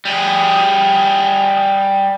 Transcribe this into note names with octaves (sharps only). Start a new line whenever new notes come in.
G3 G#4